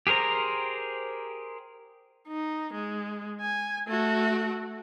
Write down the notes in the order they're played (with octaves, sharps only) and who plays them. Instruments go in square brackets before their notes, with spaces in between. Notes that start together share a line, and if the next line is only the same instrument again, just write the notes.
[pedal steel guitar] G4 G#4 A#4 C5 A#5
[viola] D#4
G#3
G#5
A3 F#4